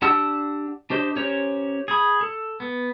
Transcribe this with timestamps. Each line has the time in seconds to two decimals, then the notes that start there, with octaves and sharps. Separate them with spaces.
0.02 D4 G4 F#5 A5 E6
0.90 D4 G4 C5 D#5
1.16 C#4 G4 A#4 C5 C#5
1.88 G#4 B5
2.21 A4
2.60 B3